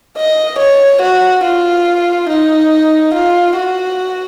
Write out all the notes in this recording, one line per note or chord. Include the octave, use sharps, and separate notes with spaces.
D#5
C#5
F#4
F4
D#4
F4
F#4